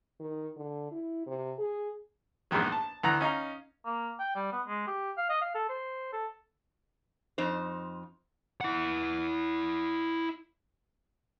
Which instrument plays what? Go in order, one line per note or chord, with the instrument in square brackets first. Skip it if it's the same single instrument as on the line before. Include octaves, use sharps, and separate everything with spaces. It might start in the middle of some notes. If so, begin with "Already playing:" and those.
[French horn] D#3
D3
E4
C3
G#4
[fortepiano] A#1 E2 G#2 D#3 F#3
A5
D2 E3 F#5 A#5 F#6
C#4 D#4 F5 A#5
[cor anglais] A#3
G5
G3
B3
G#3
G4
F5
D#5
F5
A4
C5
A4
[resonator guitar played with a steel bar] F2 D#4 C5
[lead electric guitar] E4 F#5